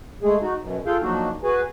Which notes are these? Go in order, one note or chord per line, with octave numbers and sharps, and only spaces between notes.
G#3 A3 G#4
D#4 F#4
F#2 B2
F4 G#4 A4 F5 G5
F3 F#3 A#3 D4 D#4 F#4
F#4 G#4 B4 G#5